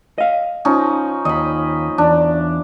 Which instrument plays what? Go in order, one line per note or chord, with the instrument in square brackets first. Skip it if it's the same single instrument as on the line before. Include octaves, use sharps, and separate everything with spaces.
[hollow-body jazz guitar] D#5 F5
[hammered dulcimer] F3 C#4 D#4
[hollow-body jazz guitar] D#2 [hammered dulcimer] D#5 B5
[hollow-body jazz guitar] E2 [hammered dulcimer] D4